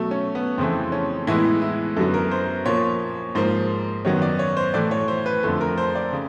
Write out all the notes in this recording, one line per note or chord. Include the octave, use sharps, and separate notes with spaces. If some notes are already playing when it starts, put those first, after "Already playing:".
Already playing: B2 F#3 A3
C#4
B3
F2 C#3 E3 A3 C4
C#4
A2 E3 G#3 B3 E4
E4
F#2 D3 F#3 B3 A4
A#4
C5
A#2 F3 A#3 C#5
G#2 F3 A#3 C5
F#2 D#3 F#3 B3 C#5
D5
C#5
C5
A2 E3 A3 D5
C#5
C5
B4
F2 D3 F3 A3
A#4
C5
D5
C#3